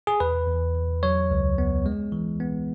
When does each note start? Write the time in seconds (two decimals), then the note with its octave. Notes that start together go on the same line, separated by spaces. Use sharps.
0.07 G#4
0.20 E2 B4
0.48 E2
0.76 E2
1.03 F#3 C#5
1.31 C#2
1.58 B3
1.86 G#3
2.12 E3
2.40 B3